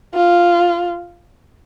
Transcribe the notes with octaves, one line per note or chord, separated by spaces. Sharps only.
F4